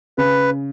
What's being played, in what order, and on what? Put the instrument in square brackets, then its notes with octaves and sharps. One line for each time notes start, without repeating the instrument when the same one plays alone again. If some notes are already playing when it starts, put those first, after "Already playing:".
[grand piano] C#3 [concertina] B4